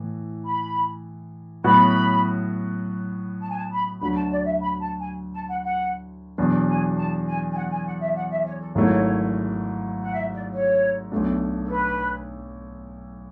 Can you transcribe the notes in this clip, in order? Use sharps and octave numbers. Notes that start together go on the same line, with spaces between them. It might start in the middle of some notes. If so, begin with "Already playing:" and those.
Already playing: A2 E3
B5
A2 F#3 B3 F#4 B5
A5
G#5
A5
B5
D2 D3 F#3 B5
A5
D5
E5
B5
A5
G#5
A5
F#5
F#5
E2 B2 F#3 B3 D4
G#5
A5
G#5
G#5
F#5
G#5
F#5
E5
F#5
E5
C#5
A4
G#1 G#2 F#3 A3 E4 C#5
F#5
E5
D5
C#5
B1 B2 A3 D4
A4
B4